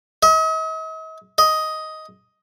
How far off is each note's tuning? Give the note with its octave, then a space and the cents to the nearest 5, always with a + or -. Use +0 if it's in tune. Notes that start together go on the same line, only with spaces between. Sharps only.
D#5 +45
D#5 +10